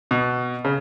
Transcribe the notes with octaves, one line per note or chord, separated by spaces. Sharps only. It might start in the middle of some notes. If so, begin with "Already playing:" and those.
B2
C#3